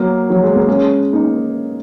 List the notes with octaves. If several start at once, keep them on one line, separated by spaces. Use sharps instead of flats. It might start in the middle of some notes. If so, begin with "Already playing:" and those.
Already playing: F#3 A#3
F#3
G#3
A#3
G#3 C#4
A#3 D#4